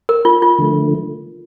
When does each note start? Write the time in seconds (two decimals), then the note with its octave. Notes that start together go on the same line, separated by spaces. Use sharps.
0.09 A#4
0.25 F4
0.42 F4
0.59 D3 F3 A3